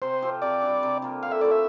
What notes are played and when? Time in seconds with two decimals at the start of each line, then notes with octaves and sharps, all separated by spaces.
0.02 C3 C5
0.22 F3 C4 G4
0.42 C3 D5
0.62 G3 D4
0.83 C3
1.02 F3 A#3
1.23 D3 F5
1.31 E5
1.41 F3 A3 E4 D5
1.51 E5